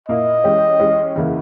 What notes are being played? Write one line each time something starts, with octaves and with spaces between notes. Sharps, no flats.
A#2 A#3 E4 D#5
E3 G#3 C#4 G4
E3 G#3 C#4 G4
E2 C#3 E3 A#3 E4